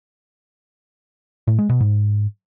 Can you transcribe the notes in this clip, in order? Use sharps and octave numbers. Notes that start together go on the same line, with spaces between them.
A2
G#3
B2
G#2